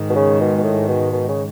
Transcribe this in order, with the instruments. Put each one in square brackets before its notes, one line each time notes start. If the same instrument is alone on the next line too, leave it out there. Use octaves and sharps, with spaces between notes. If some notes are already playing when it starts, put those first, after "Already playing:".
Already playing: [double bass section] G#2 D#3 G#3
[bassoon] B2
C#3
B2
B2
A2
B2
B2
C#3